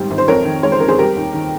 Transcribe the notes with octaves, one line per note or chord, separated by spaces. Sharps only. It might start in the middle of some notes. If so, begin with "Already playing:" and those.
Already playing: G#1 G#2 G3
G#1
C5
F2 A#4 C#5
D#3
G#3 C#5
C5
F2 A#4
G#4 C5
G3 G4 A#4
D#2
D#3